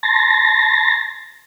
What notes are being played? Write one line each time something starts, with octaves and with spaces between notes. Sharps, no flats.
A5 A#5 C6 A6 A#6